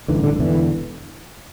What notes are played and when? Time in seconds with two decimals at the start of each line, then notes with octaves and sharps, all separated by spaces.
0.08 A1 G2 D3 E3
0.24 D3
0.39 E1 E2 D3 E3